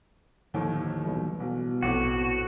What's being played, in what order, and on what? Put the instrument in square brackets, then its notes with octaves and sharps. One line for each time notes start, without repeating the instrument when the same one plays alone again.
[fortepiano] D#2 A2 [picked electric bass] D3 D#3 F3
[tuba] B1 [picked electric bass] E3 G3
[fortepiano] A1 [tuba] B2
[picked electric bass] A#1 [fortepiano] F2 A2 D6 [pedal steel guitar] F#4